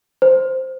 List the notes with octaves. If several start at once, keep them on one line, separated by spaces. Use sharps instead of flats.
C5